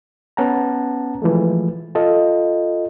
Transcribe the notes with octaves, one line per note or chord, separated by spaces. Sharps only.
B3 C#4 F#5 A5 A#5
E3 F3 G#3 A3
F4 A4 D#5